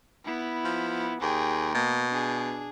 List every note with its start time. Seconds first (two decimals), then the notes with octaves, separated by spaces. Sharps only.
0.25 B3 E4
0.64 F3
1.21 D#2 G#4 G5
1.75 B2 A#3
2.11 D4 G#4